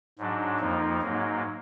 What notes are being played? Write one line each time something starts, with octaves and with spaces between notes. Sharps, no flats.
G#2 F#3 D4
F2 F3 A#3 D#4
G#2 F#3 A#3